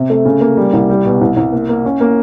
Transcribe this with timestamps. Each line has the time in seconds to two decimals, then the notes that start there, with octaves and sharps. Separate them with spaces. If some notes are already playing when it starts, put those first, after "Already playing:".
Already playing: C3
0.10 A3
0.25 C#3
0.41 A#3
0.57 G3
0.73 C2
0.89 G3
1.05 B2
1.21 C2
1.37 C2
1.52 A#3
1.69 A#3
1.85 C#4
2.01 A#3